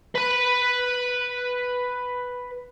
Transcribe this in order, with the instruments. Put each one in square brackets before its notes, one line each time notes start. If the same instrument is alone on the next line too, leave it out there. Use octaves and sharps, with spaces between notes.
[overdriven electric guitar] B4 B5